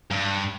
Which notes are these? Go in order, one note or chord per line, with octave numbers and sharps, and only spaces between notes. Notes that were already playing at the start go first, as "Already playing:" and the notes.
G2